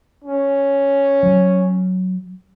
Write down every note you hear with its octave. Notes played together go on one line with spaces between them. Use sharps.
C#4
F#3